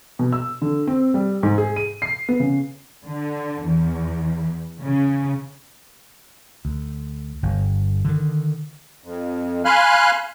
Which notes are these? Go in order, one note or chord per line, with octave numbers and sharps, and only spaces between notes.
B2
E6
D3
C4
G3
G#2
G#4
D#7
C7
B3
C#3
D3
E2
C#3
D2
G1
D3 D#3
F2
F5 G#5 B5 C6 F6 F#6